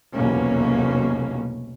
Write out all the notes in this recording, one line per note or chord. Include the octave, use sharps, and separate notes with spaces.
F1 B1 E2 B2 A#3 C#4